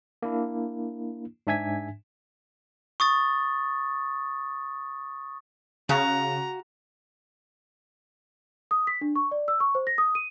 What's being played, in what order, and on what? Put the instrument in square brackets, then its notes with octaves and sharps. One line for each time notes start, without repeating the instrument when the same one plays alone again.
[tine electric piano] A#3 D4 E4
G#2 D4 E5 G#5 G#6 B6
[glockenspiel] C#6 D#6 A6
[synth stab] C#3 [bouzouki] F#4 F5 [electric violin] A#5
[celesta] D#6
B6
D4
C#6
D5
E6
C#6
C5
A#6
D#6
D#7